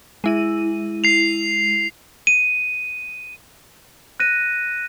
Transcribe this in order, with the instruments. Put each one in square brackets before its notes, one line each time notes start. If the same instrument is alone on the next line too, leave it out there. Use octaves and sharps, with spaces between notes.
[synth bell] G#3 E4 D#7
[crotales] C7 F7
[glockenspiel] D#7
F#6 A#6 D#7